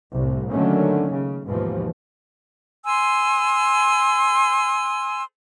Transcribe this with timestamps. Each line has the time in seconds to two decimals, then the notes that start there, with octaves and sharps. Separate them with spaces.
0.14 C2 A2 C3
0.50 D3 D#3 F#3 A3 A#3 C#4
1.10 C#3
1.46 D#2 G#2 B2 E3 F3
2.85 G#5 C6 E6 F6